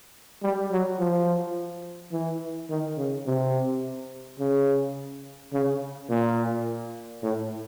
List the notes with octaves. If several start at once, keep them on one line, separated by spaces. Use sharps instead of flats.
G3
F#3
F3
E3
D#3
C#3
C3
C#3
C#3
A#2
A2